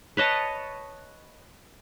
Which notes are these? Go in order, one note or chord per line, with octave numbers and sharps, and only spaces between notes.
B4 C#5 D#5 A5